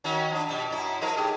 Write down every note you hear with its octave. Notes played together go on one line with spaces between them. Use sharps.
D#3 C#4 F#4
F3 D4
B2 G3
F#2 E4
F3 D#4 A#4
A2 G4 G#4